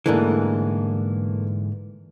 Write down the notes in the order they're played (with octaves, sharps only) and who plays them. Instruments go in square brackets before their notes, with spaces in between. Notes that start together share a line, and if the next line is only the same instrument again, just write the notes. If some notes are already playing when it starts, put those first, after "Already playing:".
[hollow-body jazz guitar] G#2 D3 E3 [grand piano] A3 A#3